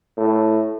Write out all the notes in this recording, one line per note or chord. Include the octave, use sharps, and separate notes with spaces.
A2